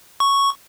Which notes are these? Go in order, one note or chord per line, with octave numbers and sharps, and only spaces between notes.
C#6